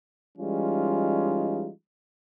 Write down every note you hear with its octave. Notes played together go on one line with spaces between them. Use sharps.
E3 G3 G#3 C#4 D#4 F4